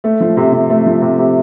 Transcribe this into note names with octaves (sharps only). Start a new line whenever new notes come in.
A3
F3
C3
C3
A3
F3
C3
C3